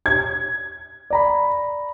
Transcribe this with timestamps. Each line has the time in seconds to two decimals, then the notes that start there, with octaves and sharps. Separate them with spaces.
0.06 G#6
1.10 D5 A#5 B5